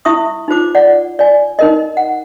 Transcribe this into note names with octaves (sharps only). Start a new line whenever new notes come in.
E4 E5 C#6 D#6
D#4 F4 C5 D6
D5 F#5
D5 G#5
D#4 A#4 D#5
F#5